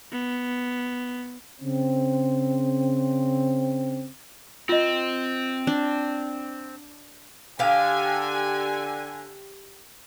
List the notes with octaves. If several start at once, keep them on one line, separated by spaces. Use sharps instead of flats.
B3
C#3 C4
C4 F4 D#5
D4
D3 G4 F5 G#5